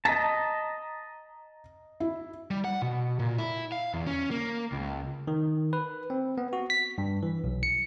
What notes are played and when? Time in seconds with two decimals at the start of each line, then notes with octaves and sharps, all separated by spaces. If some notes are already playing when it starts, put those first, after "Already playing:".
0.05 D#5 A5 A#5 A#6 B6
2.00 E4
2.51 G3
2.65 F#5
2.82 B2
3.19 A#2
3.38 E4
3.72 F5
3.94 E2
4.07 C#4
4.31 A#3
4.72 C#2
5.28 D#3
5.73 B4
6.10 C4
6.38 B3
6.53 F#4
6.70 B6
6.98 G2
7.23 E3
7.44 B1
7.63 C#7